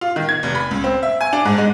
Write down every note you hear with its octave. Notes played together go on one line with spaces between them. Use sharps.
F4
D#3
G#6
F1
B5
C#2
C4
E5
G#5
D4
G#2
G#3